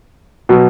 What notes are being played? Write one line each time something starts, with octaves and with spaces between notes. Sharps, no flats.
B2 F#3